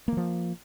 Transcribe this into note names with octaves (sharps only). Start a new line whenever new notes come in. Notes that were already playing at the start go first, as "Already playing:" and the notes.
E3 F3 A#3